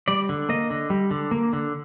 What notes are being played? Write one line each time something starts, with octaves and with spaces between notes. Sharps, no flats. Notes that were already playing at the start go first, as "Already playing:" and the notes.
G3 D5
D3
A#3 D#5
D3
G3
D3
A#3
D3